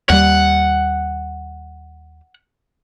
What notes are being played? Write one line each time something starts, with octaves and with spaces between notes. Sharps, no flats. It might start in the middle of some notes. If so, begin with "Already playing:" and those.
D#2 G3 F#5